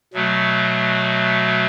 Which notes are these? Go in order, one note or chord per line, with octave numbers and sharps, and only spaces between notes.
B2 F#3 A3